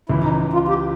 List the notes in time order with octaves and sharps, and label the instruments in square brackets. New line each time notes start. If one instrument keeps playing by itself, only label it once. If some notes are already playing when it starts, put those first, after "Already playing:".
[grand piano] C#2 C#3 E3 [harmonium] E4
[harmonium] D#4
F4
G4